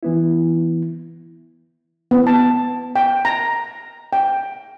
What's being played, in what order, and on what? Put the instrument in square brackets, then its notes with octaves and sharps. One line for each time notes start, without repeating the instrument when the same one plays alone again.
[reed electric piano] E3 B3 E4
[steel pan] B3
A5
G5
A#5
G5